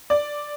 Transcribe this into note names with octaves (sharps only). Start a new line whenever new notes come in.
D5